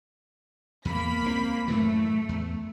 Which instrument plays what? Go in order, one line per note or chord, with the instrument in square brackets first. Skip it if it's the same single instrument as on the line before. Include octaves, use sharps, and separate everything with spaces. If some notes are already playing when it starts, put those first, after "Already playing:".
[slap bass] E2 [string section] A#3 B5 B6
[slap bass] C#2 A3 C4
[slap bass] F#2 A2 E3 [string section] A3
[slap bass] E2